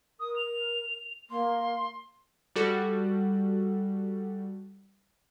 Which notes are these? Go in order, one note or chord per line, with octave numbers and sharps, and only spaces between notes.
A#4 D#6
F7
A#3 C6
G3 F#4 A4